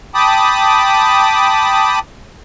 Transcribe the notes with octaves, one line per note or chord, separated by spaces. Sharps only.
G5 A5 B5 D6 D#6